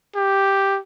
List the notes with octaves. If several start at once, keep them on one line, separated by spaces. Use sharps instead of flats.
G4